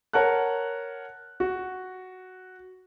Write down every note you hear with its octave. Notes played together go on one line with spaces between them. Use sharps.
A#4 C#5 F#5 A5 F#6
F#4